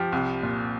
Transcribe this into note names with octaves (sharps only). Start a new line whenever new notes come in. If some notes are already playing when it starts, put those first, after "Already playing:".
Already playing: F3 G4
C2
A#2